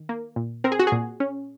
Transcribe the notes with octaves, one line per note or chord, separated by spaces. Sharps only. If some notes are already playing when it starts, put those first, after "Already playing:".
Already playing: D#3
A#3
A#2
C4 A#4
G#4
F#4
G#4
A#2
C#4